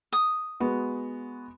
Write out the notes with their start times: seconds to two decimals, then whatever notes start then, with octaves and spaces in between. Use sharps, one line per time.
0.13 D#6
0.60 G#3 B3 F#4